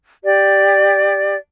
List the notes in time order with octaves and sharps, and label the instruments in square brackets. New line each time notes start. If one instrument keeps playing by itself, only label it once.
[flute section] G4 D5